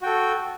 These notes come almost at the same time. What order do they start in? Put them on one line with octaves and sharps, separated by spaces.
F#4 G5 A4